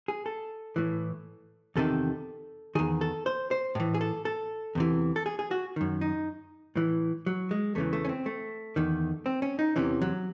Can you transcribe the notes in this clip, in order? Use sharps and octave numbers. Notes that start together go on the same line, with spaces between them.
G#4
A4
A2 E3
E2 C3 D#3 A4
E2 D#3 G#4
A4
C5
C5
A2 E3
G#4
A4
A4
E2 C3 E3
A4
G#4
G#4
F#4
F#2 D#3
D#4
A2 E3
F#3
G#3
E2 C#3 E3 A3
A3
C#4
C4
A3
E2 D#3
C4
C#4
D#4
E2 C3 E3 C#4
F#3